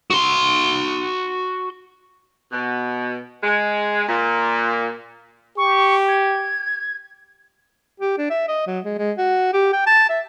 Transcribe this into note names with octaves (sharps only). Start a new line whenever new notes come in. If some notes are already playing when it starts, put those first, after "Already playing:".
F#4 C6
B2
G#3
A#2
G4 C#6
G#6
G4
D4
E5
D#5
F#3
G#3
G#3
F#4
G4
G5
A5
E5